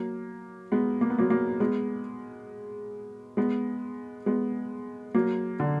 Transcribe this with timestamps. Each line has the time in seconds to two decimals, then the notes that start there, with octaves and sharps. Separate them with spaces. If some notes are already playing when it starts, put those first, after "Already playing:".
Already playing: F#3 A#3
0.72 G#3 B3
1.01 A#3
1.10 B3
1.19 F#3 A#3
1.30 F#3 A#3
1.60 G#3 B3
3.37 G#3 B3
4.26 G#3 B3
5.14 F#3 A#3
5.60 D3